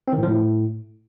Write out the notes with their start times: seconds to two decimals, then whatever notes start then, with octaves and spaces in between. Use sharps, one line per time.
0.08 C4
0.13 D#3
0.18 A2
0.23 F3
0.28 A2